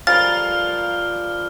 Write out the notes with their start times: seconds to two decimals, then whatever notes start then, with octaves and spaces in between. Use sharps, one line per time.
0.07 F3 G3 A#4 F5 F6 A6